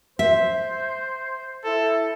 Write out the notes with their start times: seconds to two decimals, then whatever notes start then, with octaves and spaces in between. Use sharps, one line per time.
0.19 C5 E5
1.65 E4 A4